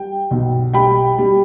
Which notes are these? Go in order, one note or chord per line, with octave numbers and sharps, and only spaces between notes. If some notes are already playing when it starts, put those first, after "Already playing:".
Already playing: G3 G5
B1
G3 G5 B5
G3